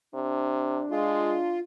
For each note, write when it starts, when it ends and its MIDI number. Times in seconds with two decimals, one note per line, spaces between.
0.15 0.83 48
0.15 1.59 62
0.91 1.37 56
0.91 1.59 65